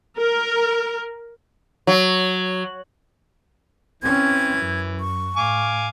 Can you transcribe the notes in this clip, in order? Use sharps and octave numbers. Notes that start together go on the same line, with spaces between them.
A#4
F#3
E3 C4 C#4 G#6
F#2
C#6
A2 F5 G#5 D6